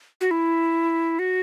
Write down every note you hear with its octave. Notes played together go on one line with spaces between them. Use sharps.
F#4
E4
F#4